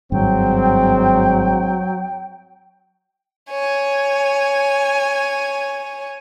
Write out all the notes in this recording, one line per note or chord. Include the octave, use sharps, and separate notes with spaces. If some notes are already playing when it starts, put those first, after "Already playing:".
G#1 G2 F#3 G#3 C4 G5
C#5 G#5